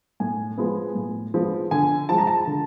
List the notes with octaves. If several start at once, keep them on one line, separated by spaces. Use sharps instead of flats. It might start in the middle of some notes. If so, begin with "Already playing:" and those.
A2 G#5
F3 G#3 B3
A2
F3 G#3 B3
D3 G#5
F3 G#3 A5
A#5
A5
D3